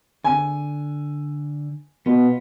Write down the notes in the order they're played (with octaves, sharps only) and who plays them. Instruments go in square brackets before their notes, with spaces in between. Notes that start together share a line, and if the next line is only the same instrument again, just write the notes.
[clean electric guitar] D3 [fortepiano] G#5
[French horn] B2 [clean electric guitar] B3 F4